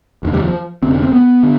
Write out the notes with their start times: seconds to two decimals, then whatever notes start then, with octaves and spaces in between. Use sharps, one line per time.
0.23 F1 D#2 D3
0.34 G3
0.43 F3
0.82 F1 D#2 D3 C4
0.93 D4
1.03 C4
1.13 B3
1.43 D3